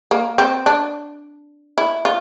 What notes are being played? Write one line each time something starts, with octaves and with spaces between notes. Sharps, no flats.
A#3
C4
D4
E4
F4